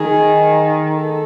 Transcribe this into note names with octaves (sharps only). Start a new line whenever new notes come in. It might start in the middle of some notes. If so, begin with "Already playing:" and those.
Already playing: D#3 G#4
A4